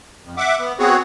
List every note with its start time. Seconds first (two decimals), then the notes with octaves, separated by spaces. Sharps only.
0.24 F2
0.37 E5 F#5 D6
0.59 B3
0.79 B3 C4 F#4 G#4 C#5